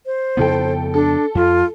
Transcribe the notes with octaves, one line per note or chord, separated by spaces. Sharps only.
C5
F2 C#3 B3 E4 A4 G5
D4 A4
F2 F4